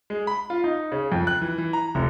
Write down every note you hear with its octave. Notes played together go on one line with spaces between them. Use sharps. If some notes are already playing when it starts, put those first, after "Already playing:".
G#3
B5
F4
D#4
C#3
F2
F#6
E3
E3
A#5
F1